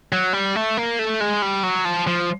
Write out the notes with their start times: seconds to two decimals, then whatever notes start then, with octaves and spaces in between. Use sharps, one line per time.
0.12 F#3
0.33 G3
0.56 A3
0.77 A#3
0.99 A3
1.20 G#3
1.42 G3
1.63 F#3
1.85 F3
2.07 F3